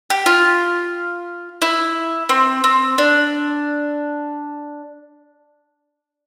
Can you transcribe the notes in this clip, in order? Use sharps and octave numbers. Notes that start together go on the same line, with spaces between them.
G4
F4
E4
C4
C4
D4